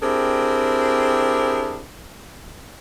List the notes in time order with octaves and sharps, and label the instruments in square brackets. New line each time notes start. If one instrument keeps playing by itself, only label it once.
[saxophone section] C4 D4 E4 G4 G#4 A#4